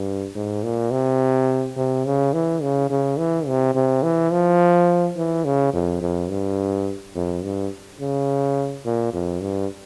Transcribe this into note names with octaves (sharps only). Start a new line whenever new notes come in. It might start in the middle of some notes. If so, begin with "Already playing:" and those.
Already playing: G2
G#2
A#2
C3
C3
C#3
E3
C#3
C#3
E3
C3
C3
E3
F3
E3
C#3
F2
F2
G2
F2
G2
C#3
A#2
F2
G2